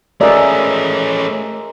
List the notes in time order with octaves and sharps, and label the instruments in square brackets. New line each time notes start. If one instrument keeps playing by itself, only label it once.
[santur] G#3 A#4 E5 [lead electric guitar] A3 C#4 [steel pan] D5